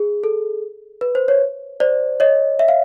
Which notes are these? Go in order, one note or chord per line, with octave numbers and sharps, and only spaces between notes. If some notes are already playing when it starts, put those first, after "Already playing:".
Already playing: G#4
A4
B4
C5
C#5
C5 D5
C#5 D#5
E5
F5